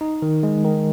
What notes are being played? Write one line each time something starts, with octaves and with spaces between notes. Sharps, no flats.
D#4
D#3
G#3
D#3